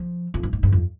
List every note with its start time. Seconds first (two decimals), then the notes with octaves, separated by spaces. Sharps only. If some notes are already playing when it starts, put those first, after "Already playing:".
Already playing: F3
0.34 F2
0.43 G2
0.53 G#2
0.63 G2
0.72 F2